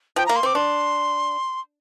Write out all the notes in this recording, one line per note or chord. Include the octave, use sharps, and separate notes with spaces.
F3 G5
A#3 A#5
C6
C4 D6
D4 C6